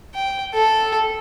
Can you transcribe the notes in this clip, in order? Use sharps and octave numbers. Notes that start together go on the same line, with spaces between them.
G5
A4